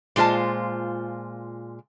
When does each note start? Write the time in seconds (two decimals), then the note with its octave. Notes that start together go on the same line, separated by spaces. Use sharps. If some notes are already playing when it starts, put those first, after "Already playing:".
0.16 A#2 G#3 F4 C5 A5